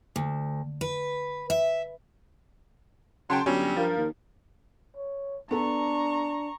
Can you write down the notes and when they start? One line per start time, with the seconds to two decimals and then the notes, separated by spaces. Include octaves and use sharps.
0.16 D2
0.81 B4
1.50 E5
3.30 C#3 F#3 G5 A5 C6
3.46 G1 F#3 G3 C#4
3.77 G2 F3 A#4
3.97 D#2
4.97 C#5
5.51 B3 D4 A4 A#5 C#6